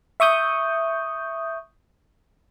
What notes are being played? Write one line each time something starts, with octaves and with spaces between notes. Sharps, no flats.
E5 C#6 D#6 G6